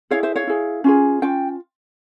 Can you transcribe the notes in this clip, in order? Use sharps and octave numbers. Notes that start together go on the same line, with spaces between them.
E4 G#4 C#5 F5
C5 E5
C#5 F5
E4 G#4
C#4 F4 G#4
C#4 F4 G5